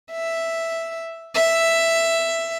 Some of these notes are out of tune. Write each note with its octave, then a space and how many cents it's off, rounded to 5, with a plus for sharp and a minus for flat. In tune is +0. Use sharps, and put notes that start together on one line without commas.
E5 +0
E5 +5